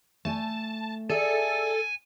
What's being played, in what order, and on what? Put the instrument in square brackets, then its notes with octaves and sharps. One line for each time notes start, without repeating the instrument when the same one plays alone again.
[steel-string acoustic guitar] A3 G#5 [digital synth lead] A5
[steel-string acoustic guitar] G#4 D5 E5 [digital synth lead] A4 [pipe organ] G#5